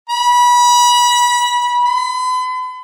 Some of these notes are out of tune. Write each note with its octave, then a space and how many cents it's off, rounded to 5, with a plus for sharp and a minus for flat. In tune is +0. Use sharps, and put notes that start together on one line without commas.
B5 -25
B5 +40